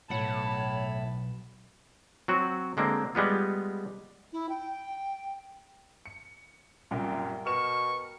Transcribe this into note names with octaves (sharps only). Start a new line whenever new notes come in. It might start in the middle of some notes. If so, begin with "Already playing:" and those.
B1 A2 C#5 F#5 A5 B5
F#3 C4 F#4
D3 G#3 A#3 C4
G3 G#3 B3 F4
E4
G5
C#7
C2 F#2 A#2 A#4 G5
B2 C#6 F6 E7